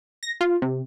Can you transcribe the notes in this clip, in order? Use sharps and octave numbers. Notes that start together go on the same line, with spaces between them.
A#6
F4
C3